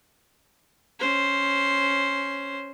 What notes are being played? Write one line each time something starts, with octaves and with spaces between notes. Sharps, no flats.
C#4 C5